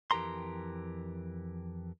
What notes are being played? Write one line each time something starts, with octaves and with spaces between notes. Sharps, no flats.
F2 E3 G4 A#4 A#5 C6